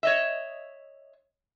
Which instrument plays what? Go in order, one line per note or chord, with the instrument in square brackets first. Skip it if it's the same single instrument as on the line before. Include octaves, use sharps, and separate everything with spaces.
[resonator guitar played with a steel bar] C#5 D#5 E5